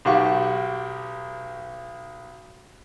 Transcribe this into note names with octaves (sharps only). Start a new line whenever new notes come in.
B1 F#4 G4 F5 C#6